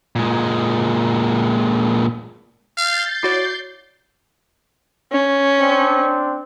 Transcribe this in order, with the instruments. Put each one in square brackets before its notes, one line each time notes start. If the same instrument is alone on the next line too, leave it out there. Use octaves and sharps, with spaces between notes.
[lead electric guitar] A#2 G#3
[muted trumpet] F5 [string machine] G6 A6 C7
[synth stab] E4 F#4 C#5 [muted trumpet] D5
[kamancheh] C#4
[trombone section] C4 D4